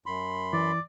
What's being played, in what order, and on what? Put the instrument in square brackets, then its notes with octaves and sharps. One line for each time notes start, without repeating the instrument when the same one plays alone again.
[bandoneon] F#2 B5 C6
[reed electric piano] E3 [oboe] D5